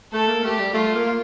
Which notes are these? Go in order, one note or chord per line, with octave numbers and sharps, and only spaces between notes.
A3 A4
A#3
A3 G4
G3
A3 F4
A#3